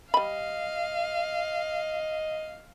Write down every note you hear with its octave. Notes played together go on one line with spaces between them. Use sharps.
G3 D#5 F5 B5